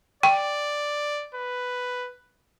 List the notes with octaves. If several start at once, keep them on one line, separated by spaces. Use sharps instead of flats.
D5 G5
B4